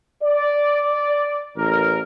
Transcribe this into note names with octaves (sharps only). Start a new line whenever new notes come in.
D5
A1 A#4